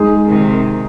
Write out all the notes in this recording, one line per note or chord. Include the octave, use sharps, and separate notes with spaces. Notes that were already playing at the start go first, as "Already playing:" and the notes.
Already playing: G#3 D#4 G#4
C3 D#3